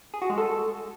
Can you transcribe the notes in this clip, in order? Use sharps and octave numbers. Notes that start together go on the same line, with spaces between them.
G#4
F#4
G#3
A4